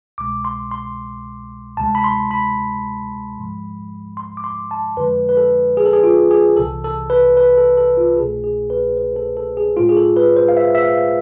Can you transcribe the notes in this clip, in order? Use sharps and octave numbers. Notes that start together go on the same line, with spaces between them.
C2 B2 G#3 D6
C6
C6
D2 C3 G#3 A5
B5
C6
B5
G#2 F3 G#3
C6
D6
C6
A5
F2 D3 F3 G#3 B4
B4
A4
G#4
A4
G#4
F4
G#4
C2 C3 E3 A4
A4
B4
B4
A4
A4
F4
C2 B2 A3 G#4
G#4
B4
C5
A4
A4
G#4
A2 G#3 F4
G#4
A4
B4
C5
F5
E5
E5
F5